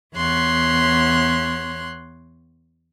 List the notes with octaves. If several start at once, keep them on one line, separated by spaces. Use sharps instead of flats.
E2 B3 C#5 C6 F#6